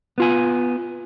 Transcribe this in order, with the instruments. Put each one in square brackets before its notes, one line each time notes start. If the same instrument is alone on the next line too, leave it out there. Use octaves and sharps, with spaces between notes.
[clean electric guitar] B3 F4 G#5